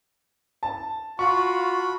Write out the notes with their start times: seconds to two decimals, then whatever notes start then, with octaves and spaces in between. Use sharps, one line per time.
0.63 A5
1.19 F4 F#4 B5 C#6